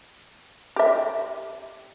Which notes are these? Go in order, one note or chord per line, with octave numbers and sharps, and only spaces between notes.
G4 E5